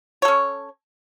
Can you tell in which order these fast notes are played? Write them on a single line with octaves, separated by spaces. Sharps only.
C#5 A4 C#4